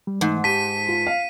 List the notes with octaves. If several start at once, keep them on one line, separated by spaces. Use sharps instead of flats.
G3
G#2 E3 A3
G4 A5 B6 D#7
F4
F5